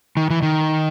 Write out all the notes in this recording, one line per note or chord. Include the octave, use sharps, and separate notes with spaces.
D#3
E3
D#3